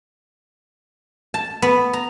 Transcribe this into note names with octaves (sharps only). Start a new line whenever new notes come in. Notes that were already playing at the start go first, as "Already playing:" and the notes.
A5
B3
A#5